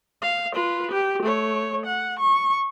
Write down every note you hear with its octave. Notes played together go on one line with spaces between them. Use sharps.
F5
F4 B4
G4
A3 C#5
F#5
C#6